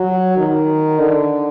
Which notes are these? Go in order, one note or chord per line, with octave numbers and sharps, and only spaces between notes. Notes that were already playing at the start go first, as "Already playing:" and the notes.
Already playing: F#3
D#3
D3